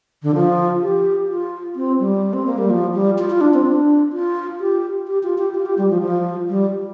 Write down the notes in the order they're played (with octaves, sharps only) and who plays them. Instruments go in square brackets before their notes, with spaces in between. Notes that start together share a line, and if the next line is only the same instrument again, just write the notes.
[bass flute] D3
F3
G4
F4
C4
G3
C4
A#3
G3
F3
G3
F4
F4
D4
C4
D4
F4
G4
G4
F4
G4
F4
G4
G3
F3
F3
G3